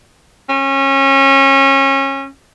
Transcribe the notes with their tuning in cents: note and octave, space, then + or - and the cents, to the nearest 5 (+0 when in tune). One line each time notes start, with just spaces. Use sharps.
C#4 -25